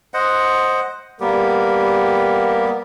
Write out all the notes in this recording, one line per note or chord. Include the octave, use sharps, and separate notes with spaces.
C5 D#5 F#5
G3 A#3 B3 G4 A#4